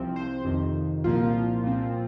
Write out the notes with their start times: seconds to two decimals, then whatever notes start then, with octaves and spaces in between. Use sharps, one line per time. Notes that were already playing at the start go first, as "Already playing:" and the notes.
Already playing: C2 C3 F3 C4
0.16 C5
0.45 F2 C3 D#3
1.04 C2 A#2 F3 A#3 F4
1.64 A#2 F3 C4